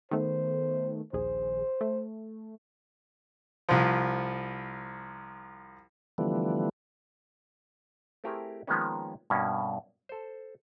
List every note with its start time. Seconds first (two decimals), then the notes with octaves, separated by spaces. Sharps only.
0.11 D#3 A3 B3 C5
1.13 A#1 D#2 G#4 C5
1.81 A3
3.69 C2 F3
6.18 D3 E3 F3 G3 A3 B3
8.24 A3 C4 E4 G4 G#4 A#4
8.67 D#3 F3 G#3 A#3 B3 C#4
9.30 G2 B2 A#3 C#4
10.09 A4 C5